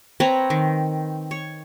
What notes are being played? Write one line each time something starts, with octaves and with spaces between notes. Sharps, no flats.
C4 B4 C#5 A#5
D#3
C#5